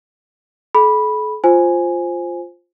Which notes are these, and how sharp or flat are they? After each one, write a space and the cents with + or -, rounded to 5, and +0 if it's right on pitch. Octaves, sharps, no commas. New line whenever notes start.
A4 -45 B5 -10
F4 +0 C5 +5 G#5 +0